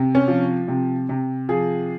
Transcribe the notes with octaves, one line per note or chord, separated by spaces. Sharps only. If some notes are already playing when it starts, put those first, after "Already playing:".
Already playing: C3
C#4
F3
C3
C3
F3 G#4